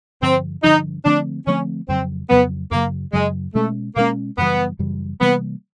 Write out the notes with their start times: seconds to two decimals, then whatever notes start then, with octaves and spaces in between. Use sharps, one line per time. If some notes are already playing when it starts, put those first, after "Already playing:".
0.22 G2 D3 F3 C4
0.64 G2 D3 F3 D#4
1.05 D3 F3 A3 C4 D4
1.47 D3 F3 A3 C4 C#4
1.89 F2 C#3 F#3 C4
2.30 F2 C#3 F#3 B3
2.71 F#2 C#3 F#3 A#3
3.13 F#2 C#3 F#3 G#3
3.55 B2 G#3 A3 C#4
3.96 B2 G#3 A#3 C#4
4.38 F#2 C#3 E3 G3 B3
4.79 F#2 C#3 E3 G3
5.21 C3 E3 G3 A#3 B3